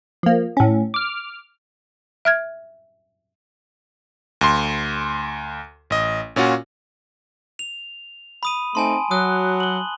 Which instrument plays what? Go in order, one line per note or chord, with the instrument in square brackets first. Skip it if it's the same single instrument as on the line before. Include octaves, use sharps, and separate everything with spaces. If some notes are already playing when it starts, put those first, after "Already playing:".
[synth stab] F3 A#3
A2 C#4
D6 F6
[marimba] E5 F6 G#6
[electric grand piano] D2 C6
A1 D#5
A#2 C#4 F4 F#4
[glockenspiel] F7
B5 D#6 D#7
[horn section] A3 C4 D#4 [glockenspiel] G#5 A5 C6
[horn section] F#3 [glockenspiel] D#6 F#6
[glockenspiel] F#7 G7